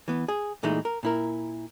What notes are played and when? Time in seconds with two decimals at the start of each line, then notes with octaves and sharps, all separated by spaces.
0.08 E3 B3
0.28 G#4
0.63 A#2 E3 G#3 A3 D#4
0.85 A#4
1.03 A#2 E4 A#4